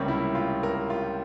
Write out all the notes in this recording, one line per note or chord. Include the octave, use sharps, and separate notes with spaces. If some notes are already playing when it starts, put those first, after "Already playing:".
Already playing: C#2 C3 G3 A#3 C#4
E4
F4
A#4
F4